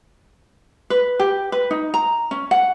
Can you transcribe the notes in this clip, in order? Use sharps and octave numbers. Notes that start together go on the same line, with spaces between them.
B4
G4
B4
D#4
A#5
C#4
F#5